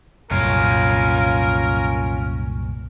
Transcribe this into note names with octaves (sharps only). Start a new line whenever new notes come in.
C2 F#2 A#2 C#4 F4 A#4